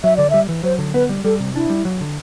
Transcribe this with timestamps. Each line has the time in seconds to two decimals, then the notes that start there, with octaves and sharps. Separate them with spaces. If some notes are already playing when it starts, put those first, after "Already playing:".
0.04 F#3 E5
0.17 D3 D5
0.30 G3 E5
0.49 E3
0.63 F#3 C5
0.79 D3
0.94 B3 B4
1.09 G3
1.24 G3 A4
1.40 C3
1.55 D4 E4
1.70 G3
1.85 F#3
2.01 D3